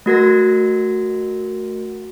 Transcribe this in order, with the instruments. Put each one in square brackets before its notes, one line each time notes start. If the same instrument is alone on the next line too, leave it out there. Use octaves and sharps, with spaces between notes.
[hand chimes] A3 F#4 A#4 A#6